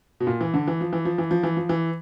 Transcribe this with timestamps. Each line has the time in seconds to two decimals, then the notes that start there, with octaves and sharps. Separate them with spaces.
0.20 B2
0.27 A#2
0.41 E3
0.54 D3
0.67 E3
0.81 F3
0.93 E3
1.05 F3
1.18 E3
1.31 F3
1.43 E3
1.57 F3
1.69 E3